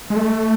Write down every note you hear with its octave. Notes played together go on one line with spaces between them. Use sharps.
G#3
A3